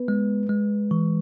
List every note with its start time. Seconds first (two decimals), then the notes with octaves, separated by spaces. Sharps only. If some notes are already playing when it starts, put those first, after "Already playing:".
Already playing: B3 B4
0.08 G#3
0.50 G#3
0.91 E3